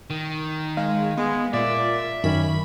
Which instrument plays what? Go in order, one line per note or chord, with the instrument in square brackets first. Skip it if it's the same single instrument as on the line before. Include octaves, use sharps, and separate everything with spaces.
[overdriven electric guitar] D#3
[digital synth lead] G#3 [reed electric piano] F5
[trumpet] G#3 [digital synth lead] B3
[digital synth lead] A#2 [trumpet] D5 [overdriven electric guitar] E5
[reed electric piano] F#2 D#3 [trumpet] C#4 [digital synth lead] B5